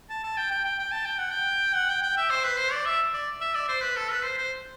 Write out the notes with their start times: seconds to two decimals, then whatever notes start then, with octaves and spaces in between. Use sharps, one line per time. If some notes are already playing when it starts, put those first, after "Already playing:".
0.10 A5
0.23 A5
0.37 G5
0.51 G5
0.65 G5
0.79 G5
0.92 A5
1.05 G5
1.18 F#5
1.31 G5
1.75 F#5
1.89 G5
2.03 G5
2.17 E5
2.30 C5
2.44 B4
2.58 C5
2.72 D5
2.85 E5
3.14 D5
3.41 E5
3.55 D5
3.69 C5
3.82 B4
3.96 A4
4.10 B4
4.24 C5
4.38 C5